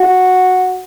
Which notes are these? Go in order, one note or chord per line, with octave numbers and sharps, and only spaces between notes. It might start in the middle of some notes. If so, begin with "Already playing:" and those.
Already playing: F#4